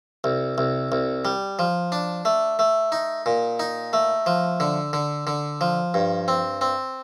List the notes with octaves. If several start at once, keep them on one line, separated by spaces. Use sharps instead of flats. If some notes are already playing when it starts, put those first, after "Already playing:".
C2
C2
C2
G3
F3
D4
A3
A3
D#4
A#2
D#4
A3
F3
D3
D3
D3
F3
G2
C4
C4